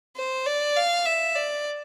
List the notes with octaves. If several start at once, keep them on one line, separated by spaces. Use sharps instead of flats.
C5
D5
F5
E5
D5